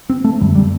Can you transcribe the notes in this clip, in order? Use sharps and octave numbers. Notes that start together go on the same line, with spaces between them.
C4
A3
F#2 D3 G3
G3